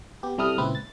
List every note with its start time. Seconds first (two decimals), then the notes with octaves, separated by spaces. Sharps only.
0.23 B3 G4
0.38 C3 G3 E4 A4 D#6 F6
0.58 A#2 C#3 G#3 C4 E4 B4
0.75 A6